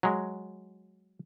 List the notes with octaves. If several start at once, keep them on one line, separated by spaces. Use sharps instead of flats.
F#3 G#3